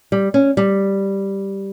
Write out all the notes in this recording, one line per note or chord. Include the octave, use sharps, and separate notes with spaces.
G3
C#4
G3